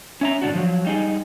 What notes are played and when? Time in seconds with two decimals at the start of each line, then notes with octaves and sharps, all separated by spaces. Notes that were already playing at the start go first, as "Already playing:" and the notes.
0.21 C#4 E5 A#5
0.42 G#2 D3 D4 F#4
0.54 F3 F#3
0.85 G3 D#4 G#4